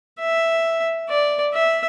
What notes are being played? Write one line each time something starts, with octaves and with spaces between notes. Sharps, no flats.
E5
D5
E5